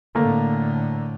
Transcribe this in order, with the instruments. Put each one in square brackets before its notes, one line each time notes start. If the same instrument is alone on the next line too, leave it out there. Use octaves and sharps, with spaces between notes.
[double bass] A2 D3 [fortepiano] A3 A#3